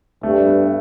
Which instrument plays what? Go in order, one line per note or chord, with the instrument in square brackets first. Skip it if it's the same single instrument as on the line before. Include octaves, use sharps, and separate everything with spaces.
[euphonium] G2 [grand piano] A3
[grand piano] B3